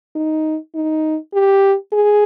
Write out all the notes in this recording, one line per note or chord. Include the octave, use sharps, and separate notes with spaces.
D#4
D#4
G4
G#4